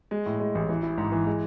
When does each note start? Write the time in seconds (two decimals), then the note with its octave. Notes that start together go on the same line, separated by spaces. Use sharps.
0.11 G#3
0.26 A2
0.40 G#3
0.55 A1
0.69 E3
0.83 E4
0.98 G#2
1.12 E3
1.27 G#3